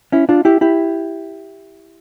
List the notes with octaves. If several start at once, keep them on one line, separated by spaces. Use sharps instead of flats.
C#4 E4
D4 F4
E4 G4
E4 G4